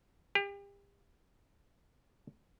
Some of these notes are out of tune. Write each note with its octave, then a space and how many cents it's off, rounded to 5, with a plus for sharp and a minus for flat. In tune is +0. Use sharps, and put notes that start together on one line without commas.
G4 +35